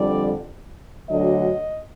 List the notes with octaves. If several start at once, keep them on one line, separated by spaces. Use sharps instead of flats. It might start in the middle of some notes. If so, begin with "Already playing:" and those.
Already playing: F2 D3 G3 D5
D2 D3 F#3 D#5